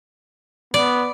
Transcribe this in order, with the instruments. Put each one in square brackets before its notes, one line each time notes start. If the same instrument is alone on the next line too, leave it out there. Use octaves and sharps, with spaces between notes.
[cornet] B3 [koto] D5